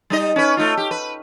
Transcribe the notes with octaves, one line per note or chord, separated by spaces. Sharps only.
G3 D#4 D#5
C#4 B4
A3 D#4 F4
G4
B4